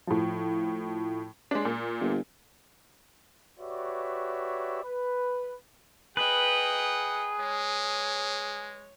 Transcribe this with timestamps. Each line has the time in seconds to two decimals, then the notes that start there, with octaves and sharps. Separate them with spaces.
0.07 A2 F3
1.51 G#3 C#4 D4
1.65 A#2
2.01 G1
3.59 F#4 G4 B4 C#5 D5 E5
4.83 B4
6.17 G#4 B4 D#5 F#5 G5 A#5
7.40 G#3 C#5